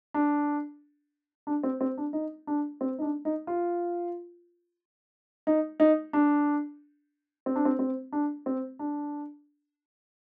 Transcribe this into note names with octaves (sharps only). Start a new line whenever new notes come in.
D4
D4
C4
C4
D4
D#4
D4
C4
D#4
D4
D#4
F4
D#4
D#4
D4
C4
D4
C4
C4
D4
C4
D4